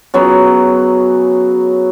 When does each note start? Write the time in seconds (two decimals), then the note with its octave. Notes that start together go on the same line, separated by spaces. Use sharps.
0.14 C#3 F#3 B3